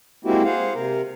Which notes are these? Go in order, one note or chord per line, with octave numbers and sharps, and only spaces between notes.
G#3 A#3 C4 E4 F#4 G4
G#4 C5 F5 F#5
C3 A#4